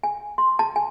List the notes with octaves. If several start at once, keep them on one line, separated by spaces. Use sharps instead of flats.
G#5
C6
A5
G#5